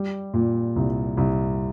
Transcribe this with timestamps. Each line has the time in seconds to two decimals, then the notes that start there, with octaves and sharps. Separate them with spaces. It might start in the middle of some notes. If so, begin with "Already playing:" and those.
Already playing: G3
0.34 A#2
0.76 C2
1.17 C2